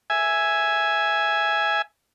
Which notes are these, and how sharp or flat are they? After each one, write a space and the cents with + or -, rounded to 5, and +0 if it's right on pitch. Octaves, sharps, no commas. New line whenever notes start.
E5 +0 G#5 +0